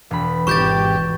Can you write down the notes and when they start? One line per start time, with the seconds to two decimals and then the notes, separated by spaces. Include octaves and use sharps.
0.11 E1 B5
0.47 G#1 G4 C#6 G6 A6 E7